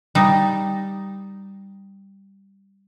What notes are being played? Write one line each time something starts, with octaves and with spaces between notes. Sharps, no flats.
G3 D#4